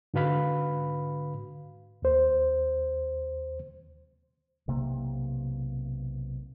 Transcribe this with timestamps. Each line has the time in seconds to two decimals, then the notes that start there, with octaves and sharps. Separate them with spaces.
0.14 G#2 D3 F#4 B4 F5 B5
2.02 D#2 C5
4.68 B1 C3 A#3